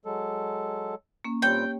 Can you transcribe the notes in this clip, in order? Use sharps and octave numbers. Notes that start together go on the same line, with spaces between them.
F#3 G#3 A4
A#3 C#4
A#2 G3 C4 G4 C#5 G5